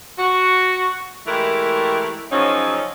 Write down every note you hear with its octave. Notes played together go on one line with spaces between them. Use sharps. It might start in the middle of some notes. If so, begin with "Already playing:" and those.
F#4
E3 G#3 A3 G4 A#4
C#3 F3 F#3 C#4 D#4